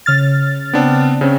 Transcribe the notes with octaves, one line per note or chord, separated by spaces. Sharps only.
C#3 F6 A6
B3 C4 D4
C#3 C4 C#4